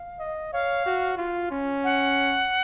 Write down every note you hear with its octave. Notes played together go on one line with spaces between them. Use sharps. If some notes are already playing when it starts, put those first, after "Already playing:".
Already playing: F5
D#5
C#5 F5
F#4
F4
C#4
F#5